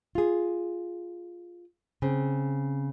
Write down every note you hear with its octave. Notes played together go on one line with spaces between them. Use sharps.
F4 G#4
C#3 C4